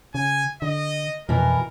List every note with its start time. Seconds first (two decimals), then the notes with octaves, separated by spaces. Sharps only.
0.15 C#3 G#5
0.62 D3 D#5
1.29 F2 B2 E3 A#4